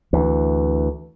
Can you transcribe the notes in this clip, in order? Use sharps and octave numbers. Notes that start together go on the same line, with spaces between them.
D2 E3